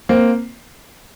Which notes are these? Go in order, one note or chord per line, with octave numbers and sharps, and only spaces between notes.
A#3 C4